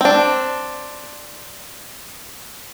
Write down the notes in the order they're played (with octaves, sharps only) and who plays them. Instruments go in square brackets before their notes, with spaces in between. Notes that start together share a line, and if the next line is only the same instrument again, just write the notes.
[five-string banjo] C4 D4